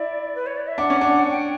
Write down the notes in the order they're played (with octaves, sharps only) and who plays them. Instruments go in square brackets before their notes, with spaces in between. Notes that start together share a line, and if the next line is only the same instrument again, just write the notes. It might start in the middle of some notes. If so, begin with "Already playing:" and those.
Already playing: [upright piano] E4 [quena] D5
[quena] B4
C#5
D5
E5
[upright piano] D4 [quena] F#5
[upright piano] C#4
D4
[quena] G5